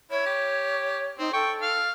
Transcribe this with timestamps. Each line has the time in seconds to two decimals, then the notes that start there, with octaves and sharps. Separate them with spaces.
0.11 E4 C#5
0.26 G4
1.19 C4 D#4
1.33 A4 G5 C#6
1.62 F5 F6